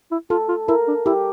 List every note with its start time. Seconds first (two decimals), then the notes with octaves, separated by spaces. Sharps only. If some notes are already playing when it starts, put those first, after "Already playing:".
0.11 E4
0.30 F4 A4
0.49 F4
0.68 E4 A#4
0.88 D4
1.06 E4 G4